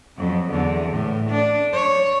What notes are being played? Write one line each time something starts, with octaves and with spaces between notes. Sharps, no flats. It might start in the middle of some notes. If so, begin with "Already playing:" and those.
F2 F#3
E2 D3
A2
D4
C#5